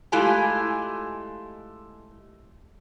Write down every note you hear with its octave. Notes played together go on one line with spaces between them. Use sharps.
G#3 A3 E4 F4 G4 G#5